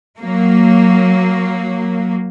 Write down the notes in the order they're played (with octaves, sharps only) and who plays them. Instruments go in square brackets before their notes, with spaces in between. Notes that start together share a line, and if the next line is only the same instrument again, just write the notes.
[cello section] F#3 A#3